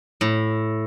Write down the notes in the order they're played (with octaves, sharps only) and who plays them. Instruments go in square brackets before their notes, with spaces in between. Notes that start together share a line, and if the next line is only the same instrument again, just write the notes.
[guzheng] A2